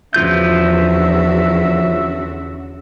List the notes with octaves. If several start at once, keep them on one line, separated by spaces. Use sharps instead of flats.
E2 D3 F3 C#4 F4 F#4 E5 G6